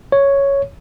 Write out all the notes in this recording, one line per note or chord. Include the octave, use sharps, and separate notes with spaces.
C#5